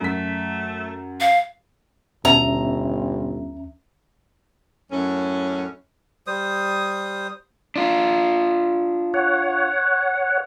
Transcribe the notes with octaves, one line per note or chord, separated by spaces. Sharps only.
F#2 A3 B6
F5
G1 D#2 B2 C#4 E5 A#5
F#2 A2 C#4
G3 C5 D#6
D4 F4
C#5 F#5